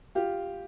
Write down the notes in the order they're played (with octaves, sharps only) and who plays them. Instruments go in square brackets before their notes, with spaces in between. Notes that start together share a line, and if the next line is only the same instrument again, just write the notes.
[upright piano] F4 G4